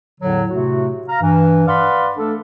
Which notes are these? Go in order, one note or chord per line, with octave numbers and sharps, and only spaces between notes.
E2 A2 D3 F#3
A2 C3 A3 F#4
F5 A#5
G2 E3
B4 D5 F5 F#5 B5 C6
A3 D4 A4